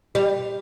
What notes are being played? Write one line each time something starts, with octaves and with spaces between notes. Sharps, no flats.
G3